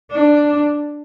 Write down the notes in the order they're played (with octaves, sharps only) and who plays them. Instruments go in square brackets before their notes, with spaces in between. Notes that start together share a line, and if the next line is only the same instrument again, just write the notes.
[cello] D4